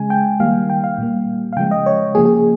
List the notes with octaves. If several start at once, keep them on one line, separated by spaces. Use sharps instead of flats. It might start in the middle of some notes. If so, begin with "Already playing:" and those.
Already playing: C#3 G#3 G#5
G5
D#3 G3 A#3 F5
G5
F5
A#2 G3 A#3
F5
C#3 F3 G#3 G5
D#5
C#5
C#3 F3 A#3 G#4
G#4